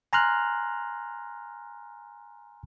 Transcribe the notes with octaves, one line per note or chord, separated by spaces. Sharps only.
G#5 A#5 C6 F6 F#6